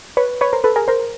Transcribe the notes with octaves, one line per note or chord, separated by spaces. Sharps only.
B4 C#5
B4 C#5
A#4 C5
A4 B4
G#4 A#4
A#4 C5